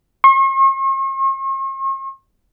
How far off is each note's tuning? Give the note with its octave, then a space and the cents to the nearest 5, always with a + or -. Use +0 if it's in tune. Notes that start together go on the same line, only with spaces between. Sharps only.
C#6 -45